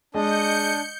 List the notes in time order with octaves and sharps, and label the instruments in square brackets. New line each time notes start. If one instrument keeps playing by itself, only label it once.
[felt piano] G#3 [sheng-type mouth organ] D4 [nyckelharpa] D#5 [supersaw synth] G6 C#7